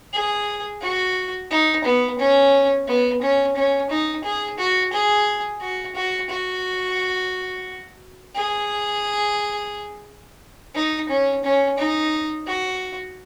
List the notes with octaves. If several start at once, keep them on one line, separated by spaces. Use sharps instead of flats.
G#4
F#4
D#4
B3
C#4
B3
C#4
C#4
D#4
G#4
F#4
G#4
F#4
F#4
F#4
G#4
D#4
C#4
C#4
D#4
F#4